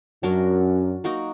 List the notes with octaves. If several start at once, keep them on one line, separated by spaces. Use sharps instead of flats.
F#2 F#3 D4 F#4 A#4
A#3 D#4 F#4 A#4